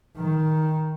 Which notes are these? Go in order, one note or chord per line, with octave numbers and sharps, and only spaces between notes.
D#3